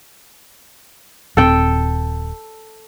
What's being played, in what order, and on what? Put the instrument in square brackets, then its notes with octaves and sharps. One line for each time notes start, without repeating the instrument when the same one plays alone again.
[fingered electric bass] D#1 C4 [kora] A4 G5